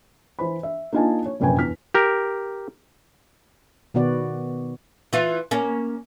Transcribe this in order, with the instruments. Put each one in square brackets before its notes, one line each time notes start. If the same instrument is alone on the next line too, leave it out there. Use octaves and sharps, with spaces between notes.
[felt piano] E3 C5 B5
E5
A#3 D4 D#4 F4 G#5 A5
C#5
F1 A#1 F#2 B4 G5 G#5
E2 F6 B6
[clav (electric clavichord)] G4 A#4
[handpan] B2 D#3 B3 F#4 D5
[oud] E3 F4
A#3 C#4